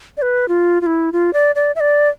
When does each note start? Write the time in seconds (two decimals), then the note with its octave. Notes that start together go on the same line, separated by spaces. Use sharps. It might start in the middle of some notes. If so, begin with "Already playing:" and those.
0.17 D5
0.22 B4
0.48 F4
0.81 F4
0.86 E4
1.13 F4
1.33 D5
1.55 D5
1.76 E5
1.80 D5